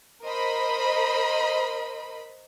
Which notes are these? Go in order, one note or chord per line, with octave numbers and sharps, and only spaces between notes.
A#4 C5 D#5 B5